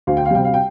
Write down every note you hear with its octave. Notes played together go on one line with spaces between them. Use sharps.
D2 F5
G5
F5
C3 G3 G5
F5
G5